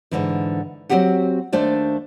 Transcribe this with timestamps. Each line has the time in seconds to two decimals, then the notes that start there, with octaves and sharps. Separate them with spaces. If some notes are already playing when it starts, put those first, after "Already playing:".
0.11 G#2 B2 D3 E3
0.89 F#3 G3 C4 F#4 G4 F#5
1.52 D#2 A3 D4 C5 D5